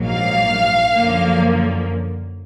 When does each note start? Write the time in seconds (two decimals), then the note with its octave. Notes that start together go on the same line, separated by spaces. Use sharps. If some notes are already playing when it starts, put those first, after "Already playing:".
Already playing: A#1 G#2 F#3 A#3
0.09 F5
0.95 F#2 D3 F3 A#3